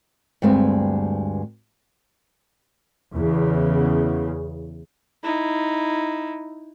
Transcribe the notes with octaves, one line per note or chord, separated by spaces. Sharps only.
D2 G2 G#3 C4 B4
E2 C#3
D#4 E4